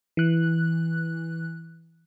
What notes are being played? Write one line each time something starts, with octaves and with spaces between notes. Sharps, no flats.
E3 F#6